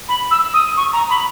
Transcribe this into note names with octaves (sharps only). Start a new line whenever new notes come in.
B5
E6
D#6
C#6
A#5
B5